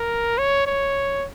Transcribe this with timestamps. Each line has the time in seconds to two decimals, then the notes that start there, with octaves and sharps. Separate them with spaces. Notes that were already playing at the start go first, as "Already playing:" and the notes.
Already playing: A#4
0.39 C#5
0.67 C#5